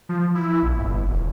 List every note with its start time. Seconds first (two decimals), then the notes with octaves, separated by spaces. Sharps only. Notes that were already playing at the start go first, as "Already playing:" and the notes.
0.09 F3
0.35 E4
0.63 A#1
0.78 G1
1.08 D#1